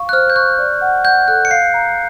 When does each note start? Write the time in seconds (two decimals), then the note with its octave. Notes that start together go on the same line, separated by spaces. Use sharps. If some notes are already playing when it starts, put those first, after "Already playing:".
Already playing: F5 C#6
0.09 F#6
0.13 C5 F6
0.30 G6
0.36 C#6 F#6
0.59 D5
0.81 F#5
1.05 F#5 G6
1.28 A4 F#6
1.45 C#7
1.51 F5 C7
1.74 A#5